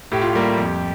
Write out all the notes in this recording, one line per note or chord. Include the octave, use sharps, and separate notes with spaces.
A2 G4
F4
G3 A#3 G4
F2